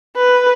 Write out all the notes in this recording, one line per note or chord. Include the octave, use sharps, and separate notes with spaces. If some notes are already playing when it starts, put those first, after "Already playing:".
B4